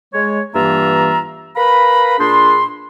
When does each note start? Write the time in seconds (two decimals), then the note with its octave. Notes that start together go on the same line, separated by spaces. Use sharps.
0.13 G#3 C#5
0.55 G2 E3 A#3 F4 E5 A#5
1.56 A#4 B4 F5 A#5 B5
2.19 A#2 D4 G#4 B5 C6